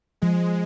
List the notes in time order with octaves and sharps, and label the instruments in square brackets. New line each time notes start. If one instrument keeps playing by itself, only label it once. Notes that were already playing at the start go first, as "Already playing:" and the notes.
[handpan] F3 [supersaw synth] G#3